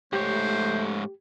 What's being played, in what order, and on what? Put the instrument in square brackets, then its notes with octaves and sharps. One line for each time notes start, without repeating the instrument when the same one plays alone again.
[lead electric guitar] G#2 C#5 [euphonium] A3 [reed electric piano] G4 [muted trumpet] C5